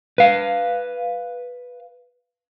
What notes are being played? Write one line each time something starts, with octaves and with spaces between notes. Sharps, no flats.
B4 F5